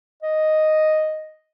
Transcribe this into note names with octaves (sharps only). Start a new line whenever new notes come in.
D#5